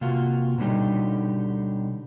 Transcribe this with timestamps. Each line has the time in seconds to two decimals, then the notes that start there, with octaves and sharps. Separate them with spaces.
0.01 C3 A#3 F4 F#4
0.58 B2 D3 F#3 G3 D#4 G4